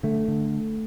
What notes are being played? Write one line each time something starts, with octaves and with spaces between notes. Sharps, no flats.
D3 A3
D3